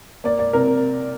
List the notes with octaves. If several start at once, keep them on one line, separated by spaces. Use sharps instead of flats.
A#3 D5
D5
C3 A#4